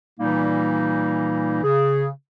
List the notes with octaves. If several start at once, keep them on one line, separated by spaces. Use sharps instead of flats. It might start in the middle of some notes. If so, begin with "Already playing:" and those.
A#2 E3 G3 A#3 D#4
C#3 G#4